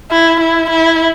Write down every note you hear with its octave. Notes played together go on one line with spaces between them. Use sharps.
E4
E4
E4